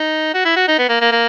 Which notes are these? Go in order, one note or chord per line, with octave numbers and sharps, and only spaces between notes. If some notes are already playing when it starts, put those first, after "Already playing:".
Already playing: D#4
F#4
E4
F#4
D#4
B3
A#3
A#3
A#3